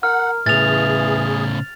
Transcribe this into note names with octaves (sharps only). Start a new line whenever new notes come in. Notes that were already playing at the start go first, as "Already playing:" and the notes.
A#4 F#5 F6
A2 C#3 E3 G#4 A6 F7